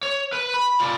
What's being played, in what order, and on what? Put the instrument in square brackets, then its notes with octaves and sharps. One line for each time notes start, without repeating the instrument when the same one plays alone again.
[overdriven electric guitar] C#5
B4
B5
F4 D5